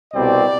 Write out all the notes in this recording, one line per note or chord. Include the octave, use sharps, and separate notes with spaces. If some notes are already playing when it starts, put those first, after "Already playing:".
C2 B2 G3 C4 D5